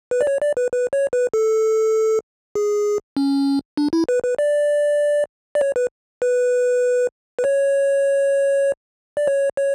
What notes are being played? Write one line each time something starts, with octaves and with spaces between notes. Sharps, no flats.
B4
D5
C#5
D5
B4
B4
C#5
B4
A4
G#4
C#4
D4
E4
B4
B4
D5
D5
C#5
B4
B4
B4
C#5
D5
C#5
C#5